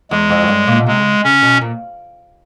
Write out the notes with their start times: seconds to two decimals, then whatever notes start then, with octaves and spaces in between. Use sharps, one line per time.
0.11 E2 G#3
0.30 F2
0.42 F#2
0.48 G2
0.67 A#2
0.80 B2
0.87 C3 G#3
1.00 C#3
1.24 C#3 C#4
1.43 B2
1.61 A#2